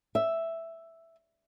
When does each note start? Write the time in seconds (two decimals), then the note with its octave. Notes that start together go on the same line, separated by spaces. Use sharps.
0.15 E5